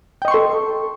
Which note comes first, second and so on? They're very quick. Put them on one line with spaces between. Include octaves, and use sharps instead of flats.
G5 D#5 C#6 C6 A4